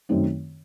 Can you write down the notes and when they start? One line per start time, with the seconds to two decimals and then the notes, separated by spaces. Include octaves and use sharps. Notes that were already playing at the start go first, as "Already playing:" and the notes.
0.09 F#2 D#3 A3 C4 D#4